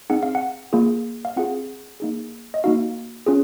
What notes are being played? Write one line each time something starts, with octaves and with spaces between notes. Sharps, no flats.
C4 D#4 G#4 F#5
F5
F#5
A#3 F4 G#4
F5
C4 F4 G#4 F#5
A#3 D#4 G#4
D#5
A#3 D#4 F#4 F5
C#4 F4 G#4